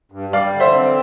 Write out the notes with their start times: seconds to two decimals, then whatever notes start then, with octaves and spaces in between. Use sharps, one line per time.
0.12 G2
0.33 G3 D5 F5
0.54 D3
0.60 C5 E5
0.74 C4